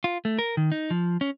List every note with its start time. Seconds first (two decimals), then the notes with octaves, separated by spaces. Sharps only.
0.04 F4
0.25 A3
0.39 A#4
0.57 D#3
0.72 D#4
0.90 F3
1.21 C#4